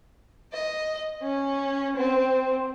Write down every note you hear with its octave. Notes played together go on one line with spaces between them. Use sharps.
D#5
C#4
C4